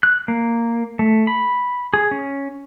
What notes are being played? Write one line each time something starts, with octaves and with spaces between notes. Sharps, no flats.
F#6
A#3
A3
B5
G#4
C#4